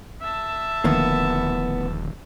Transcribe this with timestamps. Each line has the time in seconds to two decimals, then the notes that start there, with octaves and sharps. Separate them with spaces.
0.21 E5 A5
0.84 D#1 A2 D3 D#3 F3 A#3 B3